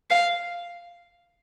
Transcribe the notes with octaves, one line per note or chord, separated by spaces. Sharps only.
F5